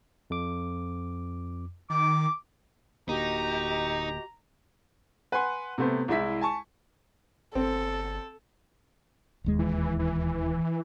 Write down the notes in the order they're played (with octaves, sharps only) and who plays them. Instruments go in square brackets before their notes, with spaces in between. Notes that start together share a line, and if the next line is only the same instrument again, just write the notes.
[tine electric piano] F2 D6
[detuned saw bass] D#3 [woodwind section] D6
[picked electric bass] D1 D3 A#3 [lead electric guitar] D#4 [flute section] F#4 G4 D#5 [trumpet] A#5
[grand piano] B4 F#5 G#5 C6
C3 A3 B3 C5
C2 G#3 E4 B6
G#5 A5 C#6
[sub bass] G1 [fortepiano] C4 [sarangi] A4
[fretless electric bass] E1 D#2 G#3
[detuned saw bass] E3
E3